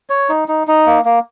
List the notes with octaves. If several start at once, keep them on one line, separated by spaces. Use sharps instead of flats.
C#5
D#4
D#4
D#4
A#3
A#3